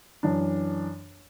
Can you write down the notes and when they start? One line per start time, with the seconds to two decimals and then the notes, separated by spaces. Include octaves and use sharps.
0.23 F#2 E3 D4